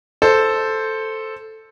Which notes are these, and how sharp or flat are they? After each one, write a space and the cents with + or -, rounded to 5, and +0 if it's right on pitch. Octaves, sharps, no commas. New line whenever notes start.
A4 +0 C5 +0